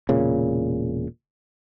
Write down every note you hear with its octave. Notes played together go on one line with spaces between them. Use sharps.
E1 A#2 C#3